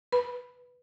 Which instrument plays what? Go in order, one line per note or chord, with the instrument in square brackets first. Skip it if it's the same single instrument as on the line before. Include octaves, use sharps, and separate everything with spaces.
[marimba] B4 B5